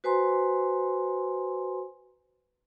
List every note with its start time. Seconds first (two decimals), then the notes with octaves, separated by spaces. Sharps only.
0.04 F#4 B4 C5 G#5 A#5 C6